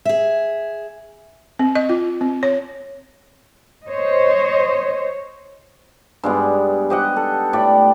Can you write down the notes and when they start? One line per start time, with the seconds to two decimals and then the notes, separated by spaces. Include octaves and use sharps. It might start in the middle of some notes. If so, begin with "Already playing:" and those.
0.05 G#4 E5
1.59 C4
1.75 D#5
1.89 F4
2.21 C4
2.43 C#5
3.87 C5 C#5 D#5
6.23 G2 G#3 B3
6.90 G4 D#5 F#5
7.16 A4
7.53 A2 D5 G5 B5